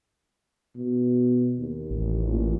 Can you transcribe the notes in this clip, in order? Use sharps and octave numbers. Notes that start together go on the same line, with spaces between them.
B2
D#2
A1
A#2